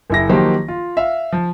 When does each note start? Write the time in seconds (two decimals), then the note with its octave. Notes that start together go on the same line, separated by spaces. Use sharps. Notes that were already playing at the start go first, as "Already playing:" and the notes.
0.10 F#1 E4 A#6
0.29 D#3 F3 F#3 A#3 G4 C5
0.68 F4
0.97 E5 F5
1.32 F3